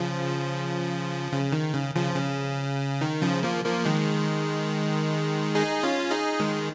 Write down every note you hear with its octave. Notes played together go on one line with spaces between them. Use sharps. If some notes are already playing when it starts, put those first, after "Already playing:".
Already playing: C#3 F3
C#3
D#3
C#3
C#3 F3
C#3
D#3
C#3 F3
F3 A#3
F3 A#3
D#3 G#3
D#4 G#4
C#4 F4
D#4 G#4
D#3 G#3